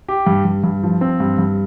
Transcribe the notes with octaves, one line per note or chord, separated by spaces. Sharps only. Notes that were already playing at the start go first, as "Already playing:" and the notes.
G4
G2
G2
G2
F3
C4
G2
G2